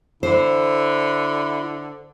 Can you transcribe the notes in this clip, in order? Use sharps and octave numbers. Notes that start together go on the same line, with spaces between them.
D3 E4 C5